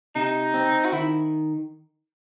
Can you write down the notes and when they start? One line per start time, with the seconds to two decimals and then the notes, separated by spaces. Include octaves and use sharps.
0.16 C3 D#4
0.54 C4
0.85 F#4
0.92 D#3 E4